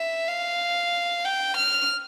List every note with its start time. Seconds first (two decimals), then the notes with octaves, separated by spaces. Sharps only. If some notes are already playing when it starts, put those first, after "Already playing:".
Already playing: E5
0.28 F5
1.24 G5
1.57 F6